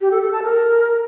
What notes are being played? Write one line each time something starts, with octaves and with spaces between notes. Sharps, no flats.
G4
A4
A4
A5
A#4